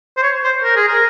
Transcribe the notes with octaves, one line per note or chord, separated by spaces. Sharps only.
C5
C#5
C5
A#4
G#4
A#4